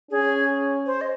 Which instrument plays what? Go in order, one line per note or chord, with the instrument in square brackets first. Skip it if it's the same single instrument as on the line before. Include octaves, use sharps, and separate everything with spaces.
[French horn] C#4 [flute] G#4
[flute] C5
D#5